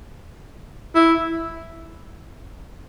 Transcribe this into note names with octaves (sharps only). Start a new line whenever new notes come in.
E4